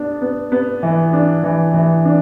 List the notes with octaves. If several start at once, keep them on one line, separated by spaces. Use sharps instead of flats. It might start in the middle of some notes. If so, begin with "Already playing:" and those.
Already playing: B3 D4
B3
B3
E3
D4
E3
E3
D4